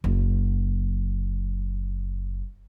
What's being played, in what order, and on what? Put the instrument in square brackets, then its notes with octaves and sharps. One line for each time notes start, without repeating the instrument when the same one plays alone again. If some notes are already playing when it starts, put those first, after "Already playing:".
[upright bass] F#1 F#3